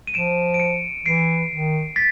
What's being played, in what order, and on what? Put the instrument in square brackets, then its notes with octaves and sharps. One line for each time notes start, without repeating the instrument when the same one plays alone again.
[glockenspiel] D#7
[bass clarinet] F3 [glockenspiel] D7 E7
[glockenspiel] D7
C#7 D#7
[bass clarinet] E3 [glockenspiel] C7 D7
[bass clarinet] D#3
[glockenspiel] A6 B6